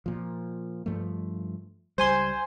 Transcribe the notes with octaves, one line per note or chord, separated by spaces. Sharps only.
A#2 F3
G2 F3 A3
C#2 G3 C5 G#5 C6